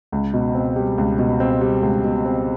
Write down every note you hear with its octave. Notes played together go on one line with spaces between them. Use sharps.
C#2
B2
C4
G3
C#2
B2
C4
G3
C#2
B2
C4